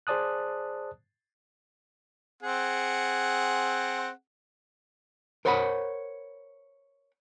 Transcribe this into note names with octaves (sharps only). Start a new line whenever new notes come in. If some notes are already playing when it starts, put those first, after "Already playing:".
G#4 C5 D5 A5 D#6 F#6
C4 G#4 F#5
A#4 C5 C#5 F#5 A#5 B5